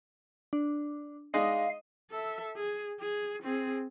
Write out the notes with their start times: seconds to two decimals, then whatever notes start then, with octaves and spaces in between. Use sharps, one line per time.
0.53 D4
1.34 G#3 D4 D#4 D#5 F5
2.11 A4 E5
2.56 G#4
3.00 G#4
3.43 C4 G#4